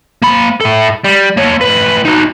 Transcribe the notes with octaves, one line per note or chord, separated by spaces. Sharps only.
A#3 B5
E4 A4
G3
A#3 C#5
A2 B4
D#4 F#4